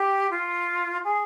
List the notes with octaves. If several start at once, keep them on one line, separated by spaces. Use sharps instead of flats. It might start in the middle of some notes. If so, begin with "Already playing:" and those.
Already playing: G4
F4
G#4